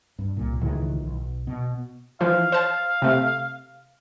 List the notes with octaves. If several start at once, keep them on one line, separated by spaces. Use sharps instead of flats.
G2
C2 A#2
C#2 A2 D#3 E3
B1
B2
E3 F3 F5
C5 A5
C3 A3